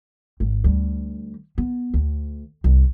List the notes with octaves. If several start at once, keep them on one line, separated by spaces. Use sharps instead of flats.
G#1
D2 G3
B3
D2
C2